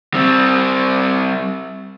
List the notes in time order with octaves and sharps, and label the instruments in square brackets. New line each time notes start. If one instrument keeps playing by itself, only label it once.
[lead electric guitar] G3 C4